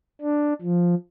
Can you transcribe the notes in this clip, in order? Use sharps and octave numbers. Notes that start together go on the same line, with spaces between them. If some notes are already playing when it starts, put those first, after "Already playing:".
D4
F3